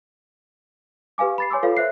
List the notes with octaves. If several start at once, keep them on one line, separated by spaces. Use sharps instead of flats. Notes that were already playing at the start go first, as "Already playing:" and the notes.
G4 B4 F5 G#5 D6
B5 A6 C7
C#5 G#5 C6 D6 E6
F4 A4 B4 C#5 F5
C5 E5 F#6 C7